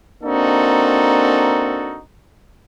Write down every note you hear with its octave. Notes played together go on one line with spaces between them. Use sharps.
A#3 C4 D4 D#4 F#4 A4